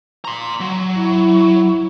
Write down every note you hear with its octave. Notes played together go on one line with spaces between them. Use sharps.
A#5 C6
F#3
E4